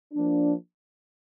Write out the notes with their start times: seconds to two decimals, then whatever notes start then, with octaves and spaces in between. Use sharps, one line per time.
0.13 F3 A#3 D4